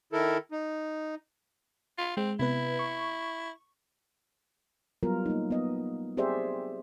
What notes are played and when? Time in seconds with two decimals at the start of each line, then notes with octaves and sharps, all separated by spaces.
0.13 D#3 E4 A4 A#4
0.52 D#4
1.98 F4
2.17 G#3 C4
2.39 C3 B3 E4 B4
2.79 C#6
5.03 F#3 G3 B3 F4 A#4
5.26 A#3 D#4
5.51 B3 D#5
6.17 C4 G4 G#4 C5 D5 E5